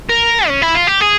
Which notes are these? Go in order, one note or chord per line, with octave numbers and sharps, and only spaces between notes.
A#4
C#4
E4
F4
G4
G#4